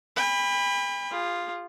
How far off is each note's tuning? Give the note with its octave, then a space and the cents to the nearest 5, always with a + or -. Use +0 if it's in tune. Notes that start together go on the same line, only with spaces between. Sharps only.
G5 +45 B5 +0
F4 +0 G#4 -40